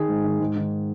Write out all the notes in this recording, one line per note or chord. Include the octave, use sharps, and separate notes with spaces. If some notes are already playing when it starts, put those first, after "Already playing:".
Already playing: D#3 G#4
G#2
D#3
G#2
D#3